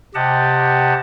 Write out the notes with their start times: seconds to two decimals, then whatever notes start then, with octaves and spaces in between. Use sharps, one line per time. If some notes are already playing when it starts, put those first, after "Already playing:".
0.15 C3 G4 D#5 F#5 A5